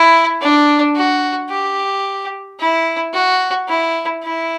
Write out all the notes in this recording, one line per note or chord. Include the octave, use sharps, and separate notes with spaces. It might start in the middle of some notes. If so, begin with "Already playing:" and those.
Already playing: E4
D4
F#4
G4
E4
F#4
E4
E4